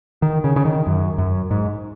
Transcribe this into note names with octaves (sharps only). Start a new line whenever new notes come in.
D#3
C#3
C#3
D#3
F#2
F#2
G#2